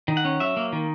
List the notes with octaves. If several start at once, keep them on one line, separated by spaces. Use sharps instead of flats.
D#3
F#5
C#4
F#3 E5
A#3
D#3